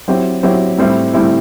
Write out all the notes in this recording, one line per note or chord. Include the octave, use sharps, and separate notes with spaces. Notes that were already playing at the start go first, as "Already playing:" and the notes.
F#3 C4 E4 G4
F#3 C4 E4 G4
A2 G3 C4 E4
A2 G3 C4 E4